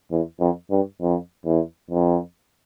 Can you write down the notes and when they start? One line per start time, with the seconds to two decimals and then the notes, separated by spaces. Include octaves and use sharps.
0.12 E2
0.41 F2
0.71 G2
1.01 F2
1.46 E2
1.91 F2